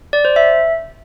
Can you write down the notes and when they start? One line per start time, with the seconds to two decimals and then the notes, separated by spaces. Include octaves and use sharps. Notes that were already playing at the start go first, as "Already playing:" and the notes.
0.13 D5
0.25 C5
0.36 E5